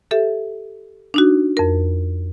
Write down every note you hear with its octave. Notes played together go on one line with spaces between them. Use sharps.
G4 A4 E5
D4 D#4 F#4
F2 A#4